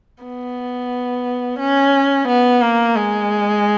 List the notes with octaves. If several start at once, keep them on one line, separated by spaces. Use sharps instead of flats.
B3
C#4
B3
A#3
G#3